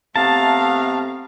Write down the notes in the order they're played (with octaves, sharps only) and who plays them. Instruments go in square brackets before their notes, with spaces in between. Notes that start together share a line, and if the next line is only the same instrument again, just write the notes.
[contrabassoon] C3 [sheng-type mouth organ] A3 B3 A#5 [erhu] F5 [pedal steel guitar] A5